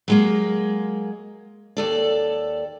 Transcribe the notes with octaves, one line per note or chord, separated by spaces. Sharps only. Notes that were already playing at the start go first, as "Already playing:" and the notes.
F#3 G#3 A#3
D#2 A4 D5